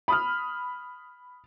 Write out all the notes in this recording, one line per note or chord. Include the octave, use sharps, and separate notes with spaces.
B5 D#6 F6